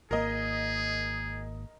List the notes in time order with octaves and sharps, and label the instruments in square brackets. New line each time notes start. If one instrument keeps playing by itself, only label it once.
[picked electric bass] G#1 A#3 [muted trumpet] G#4 [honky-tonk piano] A#4 D#5